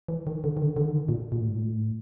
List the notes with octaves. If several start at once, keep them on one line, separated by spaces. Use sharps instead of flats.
E3
D#3
D3
D#3
D3
D3
D#3
A#2
A#2
A2
G#2
A2